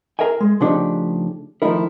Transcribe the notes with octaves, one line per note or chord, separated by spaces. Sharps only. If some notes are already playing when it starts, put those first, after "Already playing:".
G#4 A#4 E5 G5 G#5
G#3
C#3 F3 A3 D4 D#4 G4
D#3 F3 A3 D#4 E4 A#4